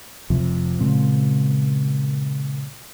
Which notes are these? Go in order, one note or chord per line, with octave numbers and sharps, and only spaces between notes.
F1 F2 C3 F3
A#2 C#3 G#3 C4